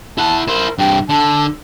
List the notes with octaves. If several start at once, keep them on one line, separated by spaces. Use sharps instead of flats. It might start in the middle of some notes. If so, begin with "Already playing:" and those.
E4 F#5 A5
E4 A#4 C5
G2 C3 G5
D3 A5